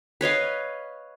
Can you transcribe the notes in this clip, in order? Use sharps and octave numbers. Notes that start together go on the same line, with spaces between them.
B4 C#5 D#5 F5